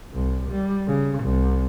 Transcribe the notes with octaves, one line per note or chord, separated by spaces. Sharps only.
C2
G3
C#3
C2